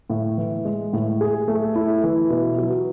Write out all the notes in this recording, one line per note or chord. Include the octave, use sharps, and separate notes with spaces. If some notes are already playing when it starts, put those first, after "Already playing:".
A2
E3
G#3
A2
G#4
A3
E4
E3
B2
F#3